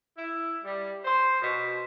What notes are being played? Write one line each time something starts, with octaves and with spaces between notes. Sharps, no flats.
E4
G3
C5
B2